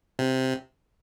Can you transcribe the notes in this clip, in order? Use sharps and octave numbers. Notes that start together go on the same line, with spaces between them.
C3